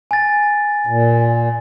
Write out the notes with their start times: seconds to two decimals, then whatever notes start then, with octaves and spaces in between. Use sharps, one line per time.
0.11 G#5 A6
0.87 A#2